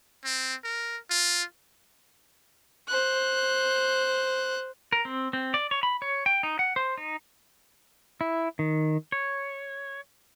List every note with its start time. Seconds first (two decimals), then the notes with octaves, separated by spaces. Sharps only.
0.25 C4
0.64 A#4
1.11 F4
2.88 C5 F#6
4.92 A#4
5.05 C4
5.33 C4
5.54 D5
5.71 C#5
5.83 B5
6.02 C#5
6.26 G5
6.43 D#4
6.59 F#5
6.76 C5
6.98 D#4
8.21 E4
8.59 D#3
9.12 C#5